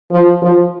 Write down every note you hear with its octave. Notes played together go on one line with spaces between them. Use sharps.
F3
F3